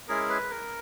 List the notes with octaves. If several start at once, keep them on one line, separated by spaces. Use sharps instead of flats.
G#3 C#4 E4 G#4 A#4
B4
A#4